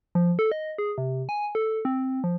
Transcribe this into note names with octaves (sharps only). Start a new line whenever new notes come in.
F3
A4
D#5
G#4
C3
G#5
A4
C4
F3